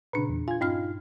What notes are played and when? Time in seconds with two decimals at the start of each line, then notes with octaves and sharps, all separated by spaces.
0.13 A#2 C#3 D4 B4
0.30 E2
0.48 F4 G#5 G#6
0.61 G2 C#4 D#4 F4 F6